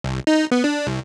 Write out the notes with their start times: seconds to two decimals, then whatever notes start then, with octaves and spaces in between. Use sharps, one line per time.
0.04 C2
0.27 D#4
0.51 B3
0.64 D4
0.87 C2